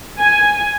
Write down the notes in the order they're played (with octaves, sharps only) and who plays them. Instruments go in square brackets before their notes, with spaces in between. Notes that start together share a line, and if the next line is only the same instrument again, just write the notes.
[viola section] G#5